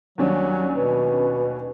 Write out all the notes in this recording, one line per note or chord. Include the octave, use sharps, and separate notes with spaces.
D#2 F#3 G3 C#4 D4
B2 B4